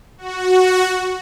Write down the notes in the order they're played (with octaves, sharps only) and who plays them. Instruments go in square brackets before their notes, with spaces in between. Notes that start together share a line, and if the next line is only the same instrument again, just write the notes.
[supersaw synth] F#4